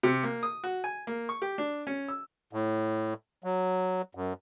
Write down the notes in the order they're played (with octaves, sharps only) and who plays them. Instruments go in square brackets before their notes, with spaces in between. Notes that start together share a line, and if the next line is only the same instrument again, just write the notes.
[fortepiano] C3
A#3
D#6
F#4
G#5
A#3
C#6
G4
D4
C#4
E6
[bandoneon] A2
F#3
F#2